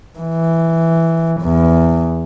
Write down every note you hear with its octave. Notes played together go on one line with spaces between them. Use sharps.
E3
E2